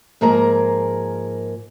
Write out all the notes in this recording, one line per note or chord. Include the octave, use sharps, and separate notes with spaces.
G#2 F3 A#3 G#4 A#4 A#5